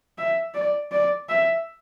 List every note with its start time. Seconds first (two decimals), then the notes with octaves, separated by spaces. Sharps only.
0.18 E5
0.54 D5
0.92 D5
1.29 E5